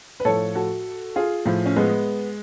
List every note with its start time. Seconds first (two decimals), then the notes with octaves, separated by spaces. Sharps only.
0.20 B4
0.25 A2 F3 A4 C#5
0.55 F#4 A4
1.16 F4 G#4
1.46 A2 F3
1.66 C#4
1.76 G#3 B3